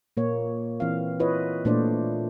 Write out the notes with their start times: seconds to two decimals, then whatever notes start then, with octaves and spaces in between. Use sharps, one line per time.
0.17 A#2 A#3 C#5
0.80 E3 C4 F5
1.20 E4 F4 B4 C#5 D#5
1.65 A#2 A3 D4 C5 D5